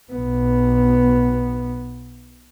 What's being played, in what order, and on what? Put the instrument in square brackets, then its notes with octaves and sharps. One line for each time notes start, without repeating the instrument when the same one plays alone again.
[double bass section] B1 [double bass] B3